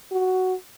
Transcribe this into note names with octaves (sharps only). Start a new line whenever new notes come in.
F#4